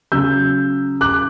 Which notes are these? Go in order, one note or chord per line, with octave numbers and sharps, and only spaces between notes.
C#3 F#3 E6 G6
D6 F#6